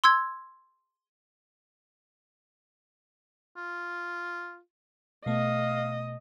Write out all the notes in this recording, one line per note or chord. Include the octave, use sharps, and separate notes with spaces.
C6 E6 G#6
F4
B2 A3 D#5 F5